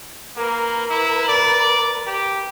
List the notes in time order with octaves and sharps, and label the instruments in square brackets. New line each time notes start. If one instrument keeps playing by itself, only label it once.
[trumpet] A#3 [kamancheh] A#4 B4
[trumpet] E4
D5
G4